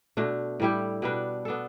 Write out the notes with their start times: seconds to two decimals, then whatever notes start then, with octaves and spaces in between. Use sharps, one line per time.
0.17 B2 A3 D4
0.60 A2 G3 E4 G4
1.02 B2 G3 D4 B4
1.45 B3 D4 A4